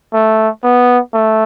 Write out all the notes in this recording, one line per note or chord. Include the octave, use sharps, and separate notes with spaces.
A3
B3
A3